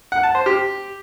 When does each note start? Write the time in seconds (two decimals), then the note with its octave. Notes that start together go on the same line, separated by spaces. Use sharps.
0.12 F#5
0.23 A5
0.35 C5
0.46 G4